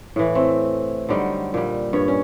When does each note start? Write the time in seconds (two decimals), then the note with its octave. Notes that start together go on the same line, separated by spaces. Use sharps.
0.16 A2 E3
0.35 A3 C4
1.09 D3 F#3 G3 D#4
1.54 A#2 G3
1.93 G2 C#5
2.08 C#4